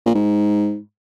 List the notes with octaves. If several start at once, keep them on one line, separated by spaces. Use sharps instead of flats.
A#2
G#2